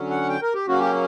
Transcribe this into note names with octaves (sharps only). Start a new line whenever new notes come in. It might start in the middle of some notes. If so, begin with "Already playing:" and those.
Already playing: D3 F#3 C#4
F#5
G5
A#4
G4
C#3 F#3 A#3 C#4 F#4
G4